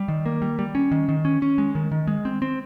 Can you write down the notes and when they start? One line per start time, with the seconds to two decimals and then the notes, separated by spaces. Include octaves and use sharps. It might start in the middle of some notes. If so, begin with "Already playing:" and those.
Already playing: G3
0.08 D#3
0.26 A#3
0.42 G3
0.59 G3
0.75 C#4
0.91 D#3
1.08 D#3
1.25 C#4
1.42 C#4
1.58 G#3
1.75 D#3
1.92 D#3
2.07 G#3
2.25 C4
2.42 C4